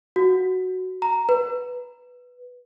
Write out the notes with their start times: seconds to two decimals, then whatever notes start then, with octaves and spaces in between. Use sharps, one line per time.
0.16 F#4
1.02 A#5
1.29 B4